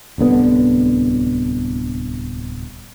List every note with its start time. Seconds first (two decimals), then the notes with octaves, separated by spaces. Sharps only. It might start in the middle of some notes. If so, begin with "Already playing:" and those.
0.18 D1 C2 D3 B3